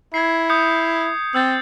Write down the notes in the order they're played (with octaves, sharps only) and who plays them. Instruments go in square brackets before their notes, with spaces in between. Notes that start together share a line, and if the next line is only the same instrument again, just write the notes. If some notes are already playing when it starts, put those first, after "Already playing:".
[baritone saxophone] E4 [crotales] G#6 C7
[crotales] D#6 G6 C#7
[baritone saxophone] C4 [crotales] E6 G6 A6